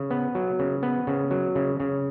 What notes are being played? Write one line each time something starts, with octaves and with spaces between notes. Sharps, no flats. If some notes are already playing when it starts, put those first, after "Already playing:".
Already playing: C#3
B3
F#3
C#3
B3
C#3
F#3
C#3
C#3